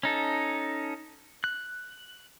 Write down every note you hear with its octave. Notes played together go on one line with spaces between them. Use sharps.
C#4 D#4 A4
F#6